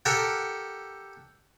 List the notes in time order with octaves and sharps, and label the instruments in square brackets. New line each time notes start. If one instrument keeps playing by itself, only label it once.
[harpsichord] G4 A4 A#4 F#5